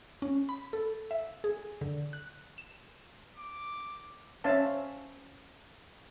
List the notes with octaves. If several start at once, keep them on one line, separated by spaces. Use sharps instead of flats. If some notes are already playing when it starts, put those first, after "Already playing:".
C#4
B5
A4
E5
G#4
D3
F#6
E7
D6
C#4 C5 E5 F5 A5